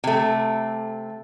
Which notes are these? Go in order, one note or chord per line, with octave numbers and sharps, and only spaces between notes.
C3 A3